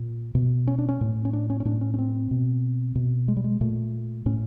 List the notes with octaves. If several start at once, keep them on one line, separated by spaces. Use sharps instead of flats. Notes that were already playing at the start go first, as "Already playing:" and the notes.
Already playing: A#2
B2
C#4
D4
C#4
A2
C#4
D4
C#4
C#4
A2 D4
C#4
C#4
C4
B2
B2
G#3
G3
G#3
A#2 A3
A2 C#4